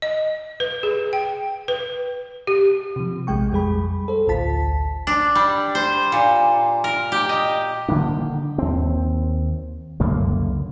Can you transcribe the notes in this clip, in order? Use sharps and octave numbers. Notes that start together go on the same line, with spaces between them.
D#5
B4
G#4
G5
B4
G4
C3 F3
A#1 G#3 G5 C#6
F2 G3 G#4 B5
A4 C5
A1 D2 F4 A5 B6
D4
G3
C5
A#2
A#4
G4
D#5
D3 D#3 A#3 D4
D#2 C4
C#2 F#2 D3 A#3